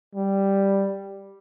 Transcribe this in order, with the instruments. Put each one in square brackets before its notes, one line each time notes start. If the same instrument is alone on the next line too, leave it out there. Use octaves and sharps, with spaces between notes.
[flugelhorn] G3